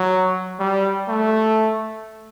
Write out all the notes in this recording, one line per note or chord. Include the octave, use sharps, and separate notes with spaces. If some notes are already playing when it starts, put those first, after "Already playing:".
Already playing: F#3
G3
A3